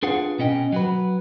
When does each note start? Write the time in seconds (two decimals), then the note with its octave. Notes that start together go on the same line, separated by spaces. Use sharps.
0.03 D4 F4 G#4 B4 F5 F#5
0.39 B2 C#4 D#5 G5
0.72 F#3 F#4 B4